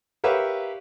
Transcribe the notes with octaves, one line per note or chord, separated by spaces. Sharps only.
G4 A#4 B4 C#5 E5 F5